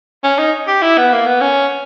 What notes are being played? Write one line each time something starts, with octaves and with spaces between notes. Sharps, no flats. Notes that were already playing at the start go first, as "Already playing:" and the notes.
C#4
D#4
G4
E4
B3
A#3
B3
C#4